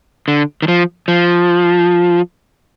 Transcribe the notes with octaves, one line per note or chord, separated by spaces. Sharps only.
D3
D#3
F3
F3